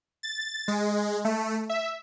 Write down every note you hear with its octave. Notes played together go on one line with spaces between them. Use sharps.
A6
G#3
A3
E5